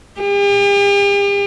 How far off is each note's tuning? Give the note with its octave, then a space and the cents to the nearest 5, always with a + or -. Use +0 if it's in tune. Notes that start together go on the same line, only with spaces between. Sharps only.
G4 +45